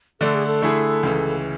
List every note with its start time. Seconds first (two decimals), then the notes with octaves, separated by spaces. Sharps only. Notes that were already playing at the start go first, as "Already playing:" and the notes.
0.21 D3 A3 D4 A4
0.34 G#4
0.47 A4
0.62 D3 A3 E4 G#4
1.03 C#2 C#3 E3